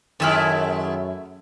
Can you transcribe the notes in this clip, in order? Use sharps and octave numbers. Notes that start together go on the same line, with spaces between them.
F#2 D#3 G#3 A3 E4 E5 F6